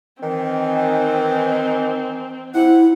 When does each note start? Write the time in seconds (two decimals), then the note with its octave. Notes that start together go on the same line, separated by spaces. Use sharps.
0.23 D#3 E3 C4
2.55 C3 E4 F#5